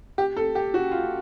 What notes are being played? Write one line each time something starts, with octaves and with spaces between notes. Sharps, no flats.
G4
A4
G4
F#4
F4